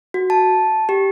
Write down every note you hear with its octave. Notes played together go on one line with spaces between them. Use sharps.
F#4
A5
G4